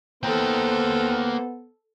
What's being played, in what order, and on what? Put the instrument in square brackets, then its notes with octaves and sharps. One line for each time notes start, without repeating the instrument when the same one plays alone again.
[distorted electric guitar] A#3 G5 [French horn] B3 [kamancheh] A4 C5